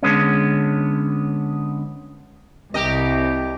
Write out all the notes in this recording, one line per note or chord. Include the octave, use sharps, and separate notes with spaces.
D3 G#3 B3 C#4
C2 G4 A#4 D#5